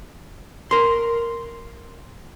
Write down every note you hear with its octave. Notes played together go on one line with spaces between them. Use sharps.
A#4 C6